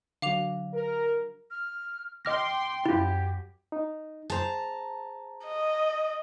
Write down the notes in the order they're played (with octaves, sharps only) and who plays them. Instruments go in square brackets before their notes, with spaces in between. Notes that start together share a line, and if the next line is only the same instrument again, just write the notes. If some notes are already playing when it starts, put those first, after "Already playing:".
[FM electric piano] D3 F#3 [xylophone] F5 D6 F7
[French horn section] A#4
[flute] F6
[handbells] D#5 F6 A#6 [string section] G5 C6 [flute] D6
[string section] F#2 [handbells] E4 F4 [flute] G4
[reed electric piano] D#4
[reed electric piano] G#4 C5 [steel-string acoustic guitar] A5 A#5
[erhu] D#5